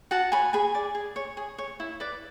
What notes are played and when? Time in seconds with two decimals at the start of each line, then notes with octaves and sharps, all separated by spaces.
0.11 F#4 F#5 A5
0.32 C#5 G#5 B5
0.53 G#4 G#5 B5
0.75 D5
0.95 G#4
1.16 C#5
1.37 G#4
1.58 C#5
1.80 E4
2.00 B4 D5